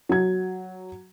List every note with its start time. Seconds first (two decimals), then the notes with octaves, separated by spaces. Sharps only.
0.09 F#3 G#6